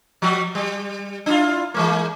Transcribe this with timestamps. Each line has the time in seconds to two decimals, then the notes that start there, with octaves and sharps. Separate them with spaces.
0.22 F3 G3 F#4
0.55 G3
1.26 D4 E4 F4
1.74 E3 G#3 A#3